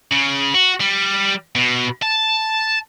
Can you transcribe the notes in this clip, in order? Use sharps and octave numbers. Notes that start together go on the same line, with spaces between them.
C#3
F#4
G3
B2
A5